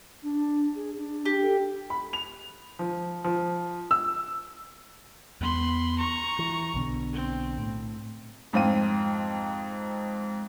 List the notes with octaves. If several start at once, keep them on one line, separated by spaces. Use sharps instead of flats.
D4
G#4
D4
D4 G4
A4
B5
F7
F3
F3
E6
E2 A3 B3 B5 C6
A#5 C#6
E3
B1 B2 D3
C4
A2
F2 G#2 C4 F5 D#7